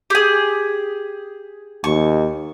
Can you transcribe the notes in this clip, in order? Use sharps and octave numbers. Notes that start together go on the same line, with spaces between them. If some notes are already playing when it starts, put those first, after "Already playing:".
G4 G#4
D#2 C#6